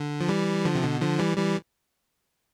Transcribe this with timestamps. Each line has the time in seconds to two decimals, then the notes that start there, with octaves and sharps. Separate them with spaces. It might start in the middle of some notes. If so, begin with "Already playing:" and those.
Already playing: D3
0.21 F3
0.28 E3 G3
0.65 D3 F3
0.75 C3
0.83 B2 D3
1.01 D3 F3
1.19 E3 G3
1.37 E3 G3